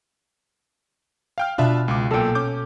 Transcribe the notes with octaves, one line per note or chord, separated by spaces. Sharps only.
F5 G5 F6
B2 D4 F4 E5
C#2 F4 D6
B1 A#2 A4 G5
C#4 D6 G6